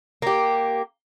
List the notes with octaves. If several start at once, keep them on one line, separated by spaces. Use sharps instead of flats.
A#3 G4